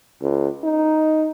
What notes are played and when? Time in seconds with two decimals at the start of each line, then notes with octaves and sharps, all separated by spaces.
0.21 C#2
0.64 D#4